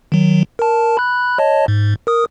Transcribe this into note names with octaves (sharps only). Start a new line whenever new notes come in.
D#3 F#3
A#4 A5
B5 F#6
C#5 D#5 A5
G#2
A#4 D#6